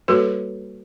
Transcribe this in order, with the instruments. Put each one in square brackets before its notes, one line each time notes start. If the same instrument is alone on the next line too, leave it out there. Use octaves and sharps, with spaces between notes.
[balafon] G3 A#3 F#4 A4 B4